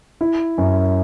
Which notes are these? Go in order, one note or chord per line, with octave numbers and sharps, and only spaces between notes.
E4
F#2